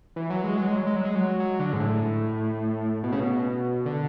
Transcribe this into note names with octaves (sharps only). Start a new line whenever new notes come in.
E3
F#3
G#3
F#3
G#3
F#3
G#3
F#3
G#3
F#3
F#3
D3
G#2
A2
B2
C#3
B2
D3